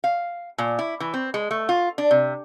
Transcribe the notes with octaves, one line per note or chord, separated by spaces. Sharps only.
F5
A#2
E4
E3
C4
G#3
A3
F4
D4
C3